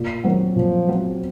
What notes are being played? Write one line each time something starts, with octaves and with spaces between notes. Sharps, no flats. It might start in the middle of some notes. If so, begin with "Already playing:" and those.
Already playing: A#2
D#3 F#3 C4 F#4
A#2 F3
F#3 C4 F#4